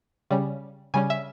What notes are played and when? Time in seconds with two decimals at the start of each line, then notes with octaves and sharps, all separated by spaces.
0.31 C#3 G3 C#4
0.94 C#3 G3 C#4 G#5
1.10 E5